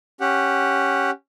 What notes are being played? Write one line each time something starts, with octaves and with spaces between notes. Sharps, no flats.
C#4 G4 F#5